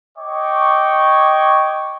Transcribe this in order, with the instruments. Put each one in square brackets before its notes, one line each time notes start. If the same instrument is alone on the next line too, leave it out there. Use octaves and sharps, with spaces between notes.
[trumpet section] C#5 D#5 G5 C#6 D6